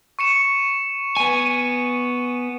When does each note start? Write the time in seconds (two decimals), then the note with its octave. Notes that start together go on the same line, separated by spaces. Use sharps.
0.19 C#6 C#7 E7
1.17 B3 G#5 D#7